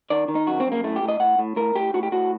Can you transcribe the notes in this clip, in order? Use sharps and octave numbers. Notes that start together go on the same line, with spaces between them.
D#3 D5
D#3
D#4
F#2 F#4
C4
F#2
A#3
A2 A3
G4
A2
D#5
A2 F#5
A2
A2 A#4
A2 G4
A2 F#4
G4
A2 F#4